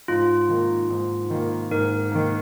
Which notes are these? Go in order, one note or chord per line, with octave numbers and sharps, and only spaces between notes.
G#2 F4
D#3 A#3
G#2
D#3 A#3
G#2 A#4
D#3 A#3